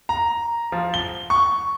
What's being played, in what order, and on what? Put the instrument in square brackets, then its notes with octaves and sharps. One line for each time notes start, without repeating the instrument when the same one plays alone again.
[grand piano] A#5
F3
G7
C#6